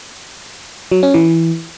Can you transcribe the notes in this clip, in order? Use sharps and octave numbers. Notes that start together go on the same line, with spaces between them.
F#3
C#4
E3